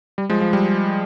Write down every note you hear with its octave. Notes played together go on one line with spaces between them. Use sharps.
G3
F3 G#3
F3
G3